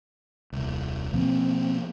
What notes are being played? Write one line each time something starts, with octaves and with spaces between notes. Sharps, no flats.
D#1 C2
B2 F3 A#3 C4